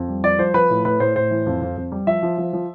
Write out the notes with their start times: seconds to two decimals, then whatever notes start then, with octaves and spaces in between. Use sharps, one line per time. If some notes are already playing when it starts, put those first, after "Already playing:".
Already playing: F2
0.08 G3
0.23 F3 D5
0.39 F3 C5
0.54 F3 B4
0.70 A2
0.85 A2 B4
1.00 A2 C5
1.16 A2 C5
1.31 E3
1.46 F2
1.62 F2
1.77 F2
1.92 G3
2.07 F3 E5
2.23 F3
2.38 F3
2.53 F3